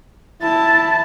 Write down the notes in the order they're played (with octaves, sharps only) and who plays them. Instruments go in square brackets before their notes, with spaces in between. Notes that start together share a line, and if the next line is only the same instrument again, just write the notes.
[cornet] E4 [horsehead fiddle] A5